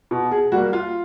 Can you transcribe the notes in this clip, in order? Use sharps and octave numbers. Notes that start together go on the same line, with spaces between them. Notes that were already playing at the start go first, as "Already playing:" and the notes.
B2
G#4
G3 A#3 F#4
F4